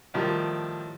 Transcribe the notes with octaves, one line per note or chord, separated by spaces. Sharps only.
A2 D#3 F3 G3